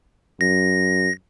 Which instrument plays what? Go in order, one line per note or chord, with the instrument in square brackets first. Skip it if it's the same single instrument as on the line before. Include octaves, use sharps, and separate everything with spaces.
[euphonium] F#2 [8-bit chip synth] A#6